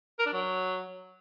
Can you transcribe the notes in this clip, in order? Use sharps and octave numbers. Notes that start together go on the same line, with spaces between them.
A#4
D4
F#3